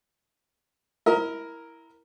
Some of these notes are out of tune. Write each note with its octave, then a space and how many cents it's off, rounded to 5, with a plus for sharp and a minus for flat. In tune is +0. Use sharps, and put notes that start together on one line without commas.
E4 +0 A#4 +0 D#5 +40